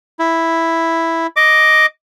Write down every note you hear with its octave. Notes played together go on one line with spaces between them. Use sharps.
E4
D#5 D6